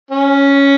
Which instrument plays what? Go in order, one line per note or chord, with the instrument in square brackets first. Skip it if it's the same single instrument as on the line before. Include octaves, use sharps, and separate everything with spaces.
[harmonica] C#4